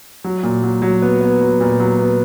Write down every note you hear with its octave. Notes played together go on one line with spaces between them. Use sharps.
F#3
A#2
F#3
F#3
B3
B3
F#3
A#2
F#3
B3